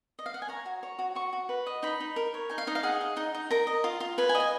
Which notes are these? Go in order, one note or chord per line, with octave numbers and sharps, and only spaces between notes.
D#5
F5
F#5
G#5
C#5 A#5
F#4
C#5
F#4
F#4 C#6
F#4
B4
D#5
D#4 B5
D#4
A#4
C#5
D#4 G#5
F5
D#4 D#5
F5
G#4 F#5
D#5
D#4
D#4
A#4 A#5
D#5
F4
F4
B4 G#5
G#5
D#5
G#5